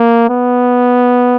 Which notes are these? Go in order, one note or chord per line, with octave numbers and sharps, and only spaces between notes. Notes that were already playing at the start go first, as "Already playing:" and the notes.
Already playing: A#3
B3